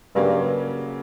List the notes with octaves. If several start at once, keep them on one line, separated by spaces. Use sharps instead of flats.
G2 C#3 F#3 A#3 C#4